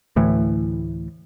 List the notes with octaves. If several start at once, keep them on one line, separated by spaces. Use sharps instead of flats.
D2 A2 E3